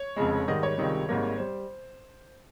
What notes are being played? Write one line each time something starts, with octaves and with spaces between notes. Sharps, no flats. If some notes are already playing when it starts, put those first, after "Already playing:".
Already playing: C#5
F1 F2 C#3 G#3
G#2 D#3 G3 D#5
C#5
C#2 C3 D#3 G3
G#1 G#2 G3 A#3
G3 C5